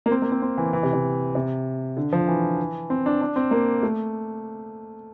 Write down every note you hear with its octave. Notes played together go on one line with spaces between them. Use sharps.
A#3
C4
A#3
C4
C4
E3
E3
C3
C3
C3
D3
F3
E3
C4
D4
D4
C4
A#3
A3